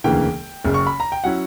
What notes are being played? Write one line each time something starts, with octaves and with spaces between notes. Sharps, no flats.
E1 D2 C#3 E3 A#3 G5
F#1 F#2 C#3
C#6
B5
A#5
G5
F#3 C#4 E4 F#5